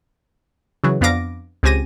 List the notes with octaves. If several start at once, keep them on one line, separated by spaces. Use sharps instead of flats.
C#3 E3 F#3
F2 B3 D4 F5 D6 A#6
C#2 C4 G4 G#5 A#6 D#7